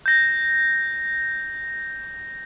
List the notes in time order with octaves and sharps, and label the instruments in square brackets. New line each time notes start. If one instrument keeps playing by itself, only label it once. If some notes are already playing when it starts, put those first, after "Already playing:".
[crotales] G6 A#6